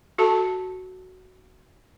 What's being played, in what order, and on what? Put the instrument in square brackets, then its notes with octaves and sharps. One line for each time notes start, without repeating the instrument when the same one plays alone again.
[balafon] F#4 A4 A5